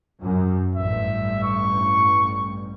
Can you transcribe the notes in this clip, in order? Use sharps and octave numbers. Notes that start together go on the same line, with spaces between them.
F#2
A1 G2 E5
C#6